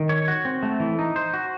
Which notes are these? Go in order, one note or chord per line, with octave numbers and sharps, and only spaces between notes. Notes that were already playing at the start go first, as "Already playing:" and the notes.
Already playing: D#3
C#5
F#4
C4
A3
E3
D#4
C5
F#4